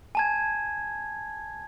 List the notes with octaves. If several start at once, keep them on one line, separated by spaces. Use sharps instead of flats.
G#5 A5 G#6